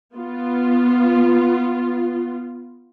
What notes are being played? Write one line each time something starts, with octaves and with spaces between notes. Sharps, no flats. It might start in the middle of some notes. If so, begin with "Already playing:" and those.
B3 F4